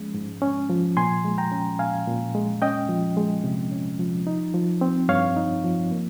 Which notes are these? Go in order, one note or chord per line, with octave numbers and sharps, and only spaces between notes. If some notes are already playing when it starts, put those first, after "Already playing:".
Already playing: F3 G#3 C#4
G#2
C#4
F3
A#2 G#5 C6
G#3
G5 A#5
C#4
A#2 F5 G#5
A#2
G#3
C#4 D#5 G5
F3
G#3
C3
C#4
F3
D#4
F3
C4
G2 C#5 F5
D#4
F3
A#3